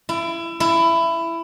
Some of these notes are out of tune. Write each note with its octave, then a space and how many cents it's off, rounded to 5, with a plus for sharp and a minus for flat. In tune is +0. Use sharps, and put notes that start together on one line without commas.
E4 +25
E4 +15